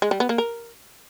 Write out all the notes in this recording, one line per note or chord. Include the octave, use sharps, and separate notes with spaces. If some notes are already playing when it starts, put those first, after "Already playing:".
G#3
G3
B3
A#3
A#4